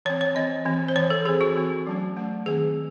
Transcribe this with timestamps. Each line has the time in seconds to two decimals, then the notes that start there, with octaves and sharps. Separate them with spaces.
0.05 E3 C#5
0.10 C4
0.21 C#5
0.35 E3 C4 D#5
0.65 E3 C4
0.88 C5
0.96 E3 C4 C#5
1.10 A4
1.25 E3 G#4
1.29 C4
1.41 F#4
1.55 E3 C4
1.87 F#3 A3 C#4
2.16 F#3 A3 C#4
2.46 D#3 G#3 C4 G#4